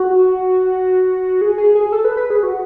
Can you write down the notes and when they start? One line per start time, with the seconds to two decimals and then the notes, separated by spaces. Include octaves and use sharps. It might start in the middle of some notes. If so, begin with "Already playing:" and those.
Already playing: F#4
1.41 G#4
1.58 G#4
1.75 G#4
1.92 A4
2.05 B4
2.17 B4
2.30 G#4
2.43 F#4